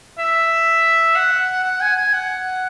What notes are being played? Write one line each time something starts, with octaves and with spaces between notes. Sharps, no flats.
E5
F#5
F#5
G#5
G#5
F#5